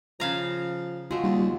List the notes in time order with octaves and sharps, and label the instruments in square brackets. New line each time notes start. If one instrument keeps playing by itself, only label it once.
[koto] C#3 F5 A#5 [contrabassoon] F3
[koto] G#3 A3 [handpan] F4 F#4
[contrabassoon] D#2 [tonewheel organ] G3